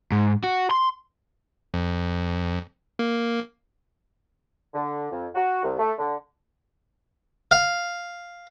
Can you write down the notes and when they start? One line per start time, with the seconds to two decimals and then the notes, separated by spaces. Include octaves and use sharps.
0.12 G#2
0.44 F#4
0.71 C6
1.74 F2
2.99 A#3
4.74 D3
5.11 F2
5.35 F#4
5.63 C2
5.79 A3
5.98 D3
7.51 F5